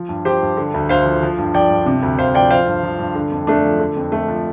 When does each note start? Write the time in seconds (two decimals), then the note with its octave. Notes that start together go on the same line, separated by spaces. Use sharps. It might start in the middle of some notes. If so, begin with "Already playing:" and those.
Already playing: F3
0.09 G2
0.25 F3 G4 C5
0.42 G2
0.57 D3
0.74 D2
0.89 D2 C5 F5
1.06 F3
1.23 F3
1.38 G2
1.54 F3 D5 G5
1.70 G2
1.86 C3
2.03 D2
2.19 D2 C5 F5
2.34 F3 D5 G5
2.51 F3 C5 F5
2.68 G2
2.83 F3
2.99 G2
3.15 D3
3.31 F2
3.47 F2 A3 D4
3.65 F3
3.79 D3
3.96 F2
4.12 F2 A3
4.28 F3